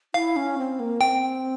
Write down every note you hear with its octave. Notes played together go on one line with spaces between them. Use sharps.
E4 F5
C#4
C4
A#3
C4 G5